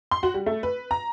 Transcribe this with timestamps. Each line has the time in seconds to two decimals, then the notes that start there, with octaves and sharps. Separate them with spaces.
0.11 C6
0.23 F#4
0.34 G3
0.46 A3
0.63 B4
0.91 A#5